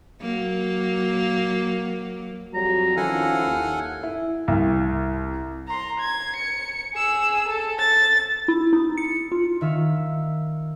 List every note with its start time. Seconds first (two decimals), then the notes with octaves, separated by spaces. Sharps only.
0.21 F#3 A#3
2.54 F2 F#3 G3 A#5
2.97 D#3 F3 C#4 E4 A4 F5 F#5 G#5
3.46 D#2
4.03 E4
4.48 C2
5.68 A#5 C6
6.00 G#6
6.36 C#7
6.94 G#4 E6
7.49 A4
7.79 A6
8.48 E4
8.73 D#4
8.98 C#7
9.32 F4
9.61 D#3 E5 F5